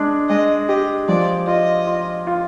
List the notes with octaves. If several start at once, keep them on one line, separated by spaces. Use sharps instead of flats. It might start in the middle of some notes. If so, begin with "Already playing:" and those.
Already playing: G#3 D4
G#3 D#5
G4 D#5
F3 D5
F4 D#5
F4
F4